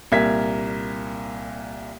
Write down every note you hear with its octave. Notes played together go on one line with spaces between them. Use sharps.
C2 A#2 A#4 E5 G#6 B6